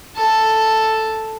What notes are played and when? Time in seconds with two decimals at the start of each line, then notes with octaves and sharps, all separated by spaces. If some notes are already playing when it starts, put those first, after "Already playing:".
0.17 A4